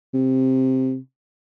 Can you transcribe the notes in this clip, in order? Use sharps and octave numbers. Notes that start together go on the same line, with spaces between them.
C3